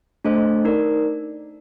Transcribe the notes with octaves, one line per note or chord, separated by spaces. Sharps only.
A3 D4 A4 C5 D#5
D#4 A#4 D5